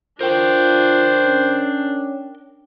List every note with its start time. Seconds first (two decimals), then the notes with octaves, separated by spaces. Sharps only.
0.21 D4 F4 A#4 C5 G5
1.25 C#4